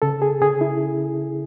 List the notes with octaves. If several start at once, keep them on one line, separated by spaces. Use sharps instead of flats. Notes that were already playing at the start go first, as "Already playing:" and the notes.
C#3 A4
G#4
C#3 G#4
E4